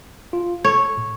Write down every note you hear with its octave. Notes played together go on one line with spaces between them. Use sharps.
F4
A4 C#5
A2